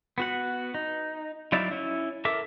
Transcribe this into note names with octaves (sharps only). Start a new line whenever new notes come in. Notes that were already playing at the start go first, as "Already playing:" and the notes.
B3 F#4 F#5
D#4
F#3 D#4 E4 D5 F5
C#4 E4
A4 A#4 E5 D6